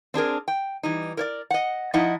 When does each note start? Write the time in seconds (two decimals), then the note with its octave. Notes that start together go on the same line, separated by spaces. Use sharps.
0.14 C4 D4 G#4 A#4
0.48 G5
0.83 E3 G3 D#4
1.17 A#4 C#5 D5
1.51 D#5 F#5
1.94 F3 D#4 E4 D#5 F#5